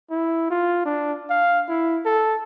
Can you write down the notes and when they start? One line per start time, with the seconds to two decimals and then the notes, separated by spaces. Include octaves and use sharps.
0.11 E4
0.50 F4
0.86 D4
1.30 F5
1.69 E4
2.06 A4